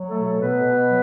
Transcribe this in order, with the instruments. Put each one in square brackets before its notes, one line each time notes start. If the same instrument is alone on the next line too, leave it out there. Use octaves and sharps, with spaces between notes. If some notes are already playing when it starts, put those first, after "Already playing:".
Already playing: [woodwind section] F#3
A3 A4
B2
A3 A4
B2 B3 B4
B2
F#3